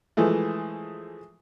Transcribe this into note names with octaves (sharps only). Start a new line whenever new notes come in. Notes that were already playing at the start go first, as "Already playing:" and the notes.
E3 F3 G#3 A3